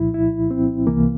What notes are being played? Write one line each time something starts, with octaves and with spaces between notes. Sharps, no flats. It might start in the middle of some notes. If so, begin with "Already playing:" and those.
Already playing: C2 A#2 F3 E4
E4
C4
C2 C3 E3 A#3